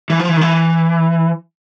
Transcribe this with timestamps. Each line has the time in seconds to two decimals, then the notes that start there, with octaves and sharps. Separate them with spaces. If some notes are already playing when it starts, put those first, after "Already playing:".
0.10 E3
0.19 F3
0.29 E3
0.37 D#3
0.41 E3